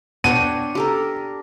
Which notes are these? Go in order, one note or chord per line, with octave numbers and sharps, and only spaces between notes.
B3 D4 C#5 F#5 G5 A5 D#7
G4 A4 A#4